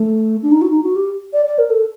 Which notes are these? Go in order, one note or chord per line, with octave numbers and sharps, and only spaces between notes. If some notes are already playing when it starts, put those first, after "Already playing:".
Already playing: A3
D4
D#4
F#4
D#4
F#4
G4
D5
D5
A#4
A4